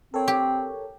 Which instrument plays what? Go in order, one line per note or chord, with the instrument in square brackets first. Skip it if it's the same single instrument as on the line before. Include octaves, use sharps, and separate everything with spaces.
[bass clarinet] C4 [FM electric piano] A4 A#4 C#5
[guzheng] G4